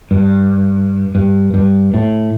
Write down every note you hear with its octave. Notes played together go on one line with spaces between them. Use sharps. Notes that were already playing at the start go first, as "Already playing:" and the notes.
G2
G2
G2
A2